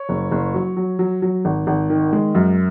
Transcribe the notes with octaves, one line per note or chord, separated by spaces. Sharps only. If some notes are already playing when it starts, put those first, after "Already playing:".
Already playing: C#5
F#1
F#1
F#3
F#3
F#3
F#3
G#1
G#1
D#3
G#3
F#2